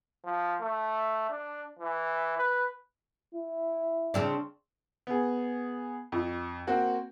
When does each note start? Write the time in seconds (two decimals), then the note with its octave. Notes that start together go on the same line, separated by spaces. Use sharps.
0.25 F3
0.61 A3
1.30 D4
1.79 E3
2.37 B4
3.35 E4
4.14 C#3 C4 D4
5.07 B3 G#4
6.12 F2
6.67 A#3 C4 F#4